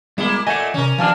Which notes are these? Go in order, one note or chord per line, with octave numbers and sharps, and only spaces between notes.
G3 G#3 A#3 B3 E4 G#4 G7
A#2 A3 D#5 E5 F#5 G#5
C3 E3 C#4 A#4
D#2 B2 F3 D4 F5 G#5 A5 F6